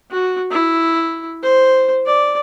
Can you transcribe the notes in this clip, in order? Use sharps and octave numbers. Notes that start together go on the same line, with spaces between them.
F#4
E4
C5
D5